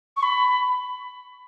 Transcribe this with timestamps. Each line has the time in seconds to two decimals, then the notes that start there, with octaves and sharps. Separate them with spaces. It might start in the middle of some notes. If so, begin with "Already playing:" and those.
0.17 C#6
0.23 B5